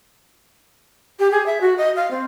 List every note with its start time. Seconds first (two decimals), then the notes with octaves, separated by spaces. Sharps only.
1.19 G4
1.31 G#4
1.46 E5
1.61 F#4
1.78 D#5
1.96 F5
2.11 C4